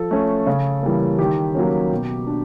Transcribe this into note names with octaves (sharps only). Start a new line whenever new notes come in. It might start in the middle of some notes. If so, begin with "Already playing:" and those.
Already playing: F3 A4
A3 C#4
C#3
E3 G3 A#3
D#3 G4
F#3 A#3 C#4
B2
D4